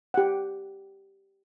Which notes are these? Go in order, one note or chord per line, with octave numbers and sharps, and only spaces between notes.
G4 F#5